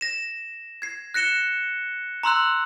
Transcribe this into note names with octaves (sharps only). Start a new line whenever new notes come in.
A#6 E7
G#6 C7
F#6 A#6 C#7 E7 G7
A#5 C6 E6 F#6